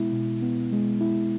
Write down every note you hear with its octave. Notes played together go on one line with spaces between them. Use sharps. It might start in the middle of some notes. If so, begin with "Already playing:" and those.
Already playing: B2 G#3 B3 E4
B2
B3
G#3
E4